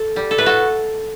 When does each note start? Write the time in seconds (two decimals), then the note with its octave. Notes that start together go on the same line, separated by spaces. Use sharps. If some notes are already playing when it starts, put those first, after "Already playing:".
Already playing: A4
0.16 G3
0.31 A4
0.38 A2 B4
0.46 F#4 A4